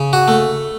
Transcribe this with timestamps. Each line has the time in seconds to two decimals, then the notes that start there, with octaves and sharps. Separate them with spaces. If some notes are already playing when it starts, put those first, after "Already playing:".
Already playing: C#3
0.13 F#4
0.28 A3